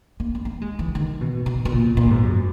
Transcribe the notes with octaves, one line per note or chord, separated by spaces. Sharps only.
A#3
B3
A#3
G#3
E3
D#3
B2
B2
B2
A#2
A#2
G#2
F#2